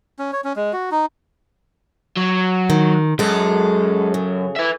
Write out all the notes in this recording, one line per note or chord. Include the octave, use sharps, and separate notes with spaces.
C#4
C#5
C#4
G#3
F#4
D#4
F#3
D#3
F#2 G#3 A4
C#3
B4 E5